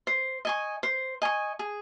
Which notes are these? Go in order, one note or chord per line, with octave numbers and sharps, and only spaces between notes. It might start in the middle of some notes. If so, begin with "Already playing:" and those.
C5
D#5 G#5 C#6
C5
D#5 G#5 C#6
G#4